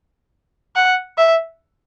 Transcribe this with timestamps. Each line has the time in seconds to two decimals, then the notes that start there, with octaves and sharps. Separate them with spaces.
0.76 F#5
1.18 E5